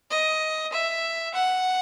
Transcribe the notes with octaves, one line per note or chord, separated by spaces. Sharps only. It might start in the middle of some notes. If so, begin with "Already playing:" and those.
D#5
E5
F#5